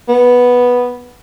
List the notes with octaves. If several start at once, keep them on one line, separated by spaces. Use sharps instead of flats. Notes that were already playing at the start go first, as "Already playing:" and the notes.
B3